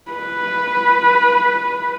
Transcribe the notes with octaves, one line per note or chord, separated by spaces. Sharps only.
B4